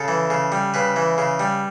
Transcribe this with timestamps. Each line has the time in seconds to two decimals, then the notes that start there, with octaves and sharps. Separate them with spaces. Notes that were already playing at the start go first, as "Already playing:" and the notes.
Already playing: C#3 A4
0.08 E3
0.30 C#3
0.52 G3
0.74 C#3 B4
0.96 E3
1.18 C#3
1.40 G3